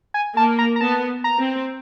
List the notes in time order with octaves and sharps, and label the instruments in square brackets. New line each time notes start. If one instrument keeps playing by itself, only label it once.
[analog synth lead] G#5
[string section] A#3 [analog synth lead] A5
[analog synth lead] A#5
A#5
[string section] B3 [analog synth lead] A5
[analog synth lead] A#5
[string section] C4